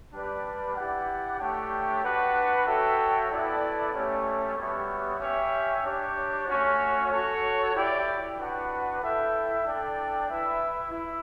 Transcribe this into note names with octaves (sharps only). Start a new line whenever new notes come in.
G3 D4 G4 B4 D5
E4 G4 D5 F#5
A3 D4 G4 C#5 G5
D4 F#4 B4 F#5
F#4 A4 C#5 E5 G5
B3 E4 A4 D5
A3 C#4 G4 C#5
G3 B3 F#4 C#5 E5
C#4 G4 C#5 E5 G5
D4 G4 C#5
A3 C#4 F#4 C#5
F#4 A4 C#5
E4 G4 D5 G5
D4 F#4 B4 F#5
E4 A4 E5 G5
D4 A4 D5 G5
E4 B4 E5
E4